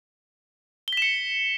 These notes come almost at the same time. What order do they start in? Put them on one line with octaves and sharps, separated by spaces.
G7 B6 E7 C#7